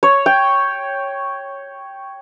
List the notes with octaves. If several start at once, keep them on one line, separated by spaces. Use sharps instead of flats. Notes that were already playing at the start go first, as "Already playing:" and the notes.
C#5
G5